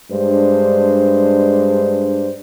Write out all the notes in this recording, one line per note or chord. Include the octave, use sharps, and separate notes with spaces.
G2 G#3 D4 C5